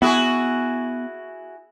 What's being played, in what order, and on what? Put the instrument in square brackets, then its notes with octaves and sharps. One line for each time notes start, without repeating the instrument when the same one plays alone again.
[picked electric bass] B3 [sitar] E4 F#4 G#4